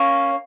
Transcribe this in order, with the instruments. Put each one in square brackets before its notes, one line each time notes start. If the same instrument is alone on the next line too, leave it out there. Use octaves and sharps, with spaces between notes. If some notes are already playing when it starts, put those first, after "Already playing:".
Already playing: [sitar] A#3 C#4